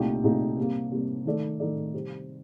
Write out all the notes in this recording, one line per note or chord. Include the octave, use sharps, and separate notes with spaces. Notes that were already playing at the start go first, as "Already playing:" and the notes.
Already playing: C2 A#2 A3 D#4 G4
C2 A#2 A3 D#4 G4
C3 G3 A#3
C3 G3 A#3
D#3 A3 D#4 A4 D5
D#3 A3 D#4 A4 D5
C3 G3 C4